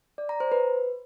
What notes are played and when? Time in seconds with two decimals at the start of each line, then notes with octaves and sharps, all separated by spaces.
0.18 D5
0.29 A#5
0.40 C5
0.52 B4